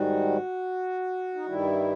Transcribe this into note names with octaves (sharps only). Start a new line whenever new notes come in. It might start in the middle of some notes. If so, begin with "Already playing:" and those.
Already playing: G#2 D#3 G3 F#4
D#4
G2 D#3 G3 E4